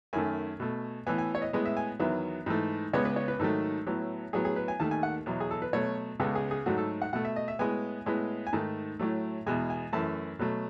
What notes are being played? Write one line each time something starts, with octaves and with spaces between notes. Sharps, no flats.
F#2 D#3 A3 G#5
B2 A3
A2 E3 B3 G#5
G#5
C#5
D#5
A2 G#3 B3 D#5
E5
G#5
E2 D#3 F#3 B3 E5
G#2 E3 A3
C#2 C#3 G#3 B3 C#5
B4
C#5
B4
G#2 D#3 F#3 A3 A4
A2 F#3 B3
A2 F#3 B3 G#4
G#4
B4
G#5
D#2 D#3 A3 A5
G#5
F#5
E2 B2 F#3
G#4
A4
B4
B2 F#3 A3 C#5
C#2 C#3 G#3 B3 A4
G#4
G#4
G#2 F#3 A3 F#4
A4
F#5
B2 A3 F#5
E5
D#5
E5
A2 G#3 B3 G#5
A2 G#3 B3
G#5
G#2 D#3 A3 A5
A2 F#3 A3
E2 B2 G#3 G#5
G#5
F#2 E3 A3 A5
B2 F#3 A3